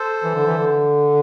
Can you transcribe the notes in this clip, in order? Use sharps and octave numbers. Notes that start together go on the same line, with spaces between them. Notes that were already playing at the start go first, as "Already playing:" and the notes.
Already playing: A4 C5
E3
D3
E3
D3